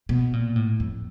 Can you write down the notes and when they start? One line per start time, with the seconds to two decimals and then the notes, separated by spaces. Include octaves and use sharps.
0.09 B2
0.33 A#2
0.56 A2
0.80 F2